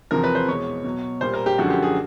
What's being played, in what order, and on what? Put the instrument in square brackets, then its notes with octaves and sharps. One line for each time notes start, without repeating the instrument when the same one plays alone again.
[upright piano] E2 C3 F3 A#4
B4
C5
E2 B2 G#3 C#5
B2 F#3
A#2 G3 C5
A#4
G4
F#2 D3 F3 G#3 F#4
G4
G#4